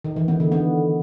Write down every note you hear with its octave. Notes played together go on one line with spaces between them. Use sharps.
D#3
E3
B3
D3
B3